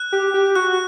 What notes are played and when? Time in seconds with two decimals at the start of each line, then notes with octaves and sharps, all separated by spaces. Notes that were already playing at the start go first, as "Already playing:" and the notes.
Already playing: F#6
0.12 G4
0.34 G4
0.55 F#4 F#6